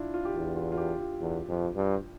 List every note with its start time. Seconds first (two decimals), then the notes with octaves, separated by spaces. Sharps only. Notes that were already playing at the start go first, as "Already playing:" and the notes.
Already playing: D4 E4 F4
0.14 F4
0.25 G4
0.35 E2 F4
0.56 F4
0.72 F4
0.77 G4
0.99 F4
1.20 E2
1.48 F2
1.76 G2